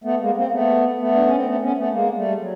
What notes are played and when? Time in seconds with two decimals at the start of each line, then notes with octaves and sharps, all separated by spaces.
0.04 A3 B3
0.20 G#3 A#3
0.36 A#3 C4
0.47 A#3
0.51 A3 B3
0.98 A3 B3
1.15 D4
1.25 C#4
1.35 C4
1.46 A3 B3
1.61 B3 C#4
1.78 A3 B3
1.92 G#3 A#3
2.17 G3 A3
2.39 F#3